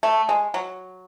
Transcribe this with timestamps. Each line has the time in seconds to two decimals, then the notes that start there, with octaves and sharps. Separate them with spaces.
0.03 A3
0.29 G#3
0.54 F#3